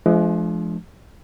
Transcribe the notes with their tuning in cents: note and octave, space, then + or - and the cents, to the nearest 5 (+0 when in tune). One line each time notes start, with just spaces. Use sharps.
F3 -25 G#3 +35 D4 +0